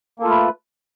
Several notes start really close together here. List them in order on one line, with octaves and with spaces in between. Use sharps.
A#3 A4 F4 A3 B4